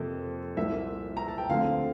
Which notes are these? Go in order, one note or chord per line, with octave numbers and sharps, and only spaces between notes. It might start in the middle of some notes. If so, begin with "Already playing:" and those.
Already playing: F2 C3 F3 A#3 A4
C2 A#2 F3 A#3 E5
A#5
A5
G5
D2 D3 F3 C4 F5